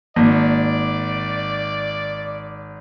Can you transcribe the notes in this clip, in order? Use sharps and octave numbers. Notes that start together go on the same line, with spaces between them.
G#1 A#3 D5